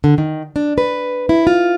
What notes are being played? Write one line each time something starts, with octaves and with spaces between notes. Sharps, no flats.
D3
D#3
D4
B4
E4
F4